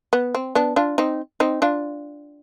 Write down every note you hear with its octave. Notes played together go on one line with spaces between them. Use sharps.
B3
C4
B3 D4
D4 F4
C4 D#4
C4 D#4
D4 F4